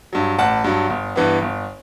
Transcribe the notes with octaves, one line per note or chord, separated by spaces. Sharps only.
G2 F#3
A1 F#5 A5
G2 F#3
G1
G2 E3 B3
G1